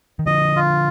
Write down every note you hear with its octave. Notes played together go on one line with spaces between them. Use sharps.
D#3
D3 F3 D#5
F4